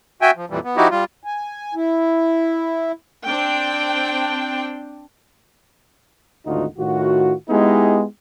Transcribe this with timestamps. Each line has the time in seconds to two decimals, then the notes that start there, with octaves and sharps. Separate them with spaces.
0.22 F#4 E5 G5 G#5
0.36 F3
0.50 F2 A#2 E3 G3
0.64 B3
0.77 F3 D#4 E4 F#4 G4
0.91 G3 F4
1.24 G#5
1.75 E4
3.26 C4 D4 G5
6.46 G#1 D2 D#4 F4 F#4
6.78 A2 D#3 F4 F#4
7.50 G#3 B3 D#4 E4 G4 G#4